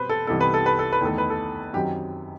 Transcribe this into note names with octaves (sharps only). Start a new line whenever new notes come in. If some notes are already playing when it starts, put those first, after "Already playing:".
Already playing: B2 G3 C4 B4 C5
A4
C2 C3 E3 B3 D#4 A4
B4
A4
B4
A4
B4
E2 D#3 A3 D#4 A4
B4
A4
F#2 D#3 F#3 C4 G4